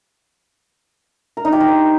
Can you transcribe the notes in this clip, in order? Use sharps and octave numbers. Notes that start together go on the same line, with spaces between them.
A#4
D#4
G4
C5